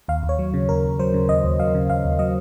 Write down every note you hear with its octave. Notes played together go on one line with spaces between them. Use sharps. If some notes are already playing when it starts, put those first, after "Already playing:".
D#2 F5
D#2
C#5
F#3
C#3
D#2 A#4
D#2
F#3 C5
C#3
D#2 D#5
D#2
F#3 F5
C#3
D#2 F5
D#2
F#3 D#5